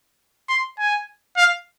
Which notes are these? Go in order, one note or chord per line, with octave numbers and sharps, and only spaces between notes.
C6
G#5
F5